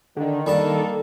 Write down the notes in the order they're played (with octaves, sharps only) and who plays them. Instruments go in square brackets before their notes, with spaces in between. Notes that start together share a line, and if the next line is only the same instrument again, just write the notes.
[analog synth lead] D3 [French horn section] D#3
[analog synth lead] D#3 [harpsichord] G3 D4 A5 [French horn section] A#3 A4